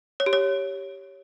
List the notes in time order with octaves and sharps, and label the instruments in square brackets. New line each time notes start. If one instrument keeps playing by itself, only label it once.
[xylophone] C#5
G4
C#5